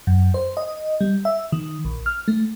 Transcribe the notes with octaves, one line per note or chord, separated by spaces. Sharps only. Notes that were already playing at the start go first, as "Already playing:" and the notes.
F#2
C5
D#5
G3
E5
D#3
A#1
F6
A3